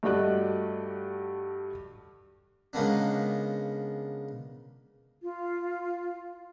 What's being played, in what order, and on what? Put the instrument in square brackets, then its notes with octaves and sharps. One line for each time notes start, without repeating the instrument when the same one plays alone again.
[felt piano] G2 A3 F#4 D5 D#5 F#6
[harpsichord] C#3 G#3 A#3 B3 D4
[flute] F4